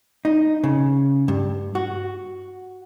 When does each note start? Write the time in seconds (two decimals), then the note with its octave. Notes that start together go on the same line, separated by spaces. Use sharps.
0.25 D#4
0.64 C#3
1.28 G2
1.75 F#4